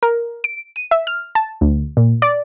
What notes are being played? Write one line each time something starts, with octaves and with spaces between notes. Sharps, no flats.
A#4
D7
D#7
E5
F6
A5
D2
A#2
D5